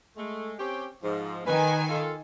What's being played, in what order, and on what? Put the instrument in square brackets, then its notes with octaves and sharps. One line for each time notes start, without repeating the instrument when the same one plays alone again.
[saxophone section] G#3 A3
C4 C#4 G4
G#2 F3
[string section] D#3 G#5 [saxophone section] B4
[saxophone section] F4 A4